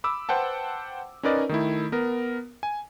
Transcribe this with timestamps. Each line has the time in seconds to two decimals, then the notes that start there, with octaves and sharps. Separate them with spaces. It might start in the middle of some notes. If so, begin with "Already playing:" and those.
0.04 B5 D6 E6
0.29 B4 C5 F#5 G5 A5
1.23 C#4 D#4 A#4 B4 D5 D#5
1.49 D#3 A3 E4
1.92 B3 A#4
2.63 G#5